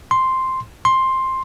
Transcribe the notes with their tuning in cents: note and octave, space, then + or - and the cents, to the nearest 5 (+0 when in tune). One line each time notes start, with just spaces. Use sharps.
C6 +0
C6 +10